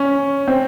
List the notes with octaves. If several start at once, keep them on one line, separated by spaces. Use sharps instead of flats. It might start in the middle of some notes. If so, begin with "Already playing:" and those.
Already playing: C#4
C4